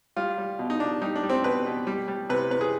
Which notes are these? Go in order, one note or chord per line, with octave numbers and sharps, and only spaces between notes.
G3 F4
G3
B2
D#4
B2 D4
G3 D#4
D4
G3
C4
B2 B4
B2
G3
G3
C3 B4
C3 B4
G#4